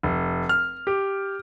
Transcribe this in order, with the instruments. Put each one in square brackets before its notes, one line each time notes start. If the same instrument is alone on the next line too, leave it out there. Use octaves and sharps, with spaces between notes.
[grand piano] F1
F6
G4